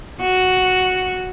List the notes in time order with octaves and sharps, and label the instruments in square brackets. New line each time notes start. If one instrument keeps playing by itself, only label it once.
[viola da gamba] F#4